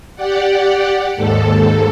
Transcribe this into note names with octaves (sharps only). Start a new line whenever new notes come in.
G4 D5 F#5
D#2 G#2 A4